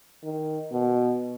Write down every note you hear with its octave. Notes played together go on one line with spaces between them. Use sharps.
D#3
B2